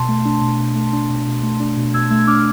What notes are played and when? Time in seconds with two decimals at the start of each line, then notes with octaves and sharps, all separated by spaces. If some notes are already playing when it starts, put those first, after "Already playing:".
Already playing: B2 A5 C6
0.08 A3
0.25 D4
0.41 B2
0.59 B2
0.75 A3
0.93 D4
1.09 B2
1.26 B2
1.43 A3
1.60 D4
1.77 B2
1.94 B2 E6 G#6
2.10 A3 E6 G#6
2.27 D4 D6 F6